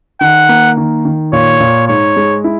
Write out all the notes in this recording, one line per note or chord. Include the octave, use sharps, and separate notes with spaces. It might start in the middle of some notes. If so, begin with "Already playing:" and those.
D#3 F#5
A#3
D#3
D#3
A#2 C#5
A#2
G#2 C#5
G#3
E4